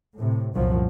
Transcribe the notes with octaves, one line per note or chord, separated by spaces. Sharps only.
A2 C3
C2 F#2 A#2 F3 F#3